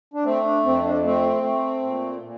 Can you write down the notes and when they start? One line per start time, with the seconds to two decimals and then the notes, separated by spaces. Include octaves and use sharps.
0.14 D4
0.24 A3 C4
0.44 D4
0.63 F2 C4
0.84 D4
1.04 A3 C4
1.43 A3
1.83 A#2
2.23 A#2